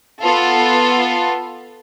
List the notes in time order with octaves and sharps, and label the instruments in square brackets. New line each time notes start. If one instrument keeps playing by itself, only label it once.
[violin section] B3 F4 A4